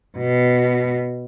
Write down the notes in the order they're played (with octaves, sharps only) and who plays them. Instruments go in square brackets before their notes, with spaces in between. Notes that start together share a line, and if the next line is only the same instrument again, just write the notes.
[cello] B2